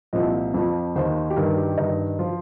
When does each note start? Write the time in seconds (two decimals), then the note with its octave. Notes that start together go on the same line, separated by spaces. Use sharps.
0.13 C2 A#2 F3 D#5
0.54 F2 F3
0.95 D#2 D#3 C5
1.30 G4
1.36 G2 D#3 A#4
1.58 G4
1.78 G2 D#3 D#4
2.19 F3 F4